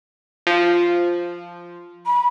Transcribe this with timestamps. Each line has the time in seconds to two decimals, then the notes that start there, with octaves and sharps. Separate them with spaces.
0.47 F3
2.06 B5